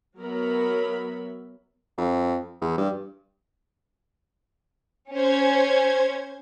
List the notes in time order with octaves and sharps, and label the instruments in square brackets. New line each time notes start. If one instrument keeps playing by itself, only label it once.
[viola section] F#3 B3 A#4 E5 B5
[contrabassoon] F2
E2
G2
[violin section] C#4 [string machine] C5 G#6